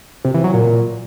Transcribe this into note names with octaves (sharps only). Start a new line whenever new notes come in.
C3
E3
F#3
A#2